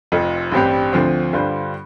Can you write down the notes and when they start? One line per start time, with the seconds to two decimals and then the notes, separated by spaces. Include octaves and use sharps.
0.12 F1 F2 F3
0.52 A1 G2 G3 C4 G4
0.93 D2 D3 F3 C4
1.33 G2 D3 G3 F4 C5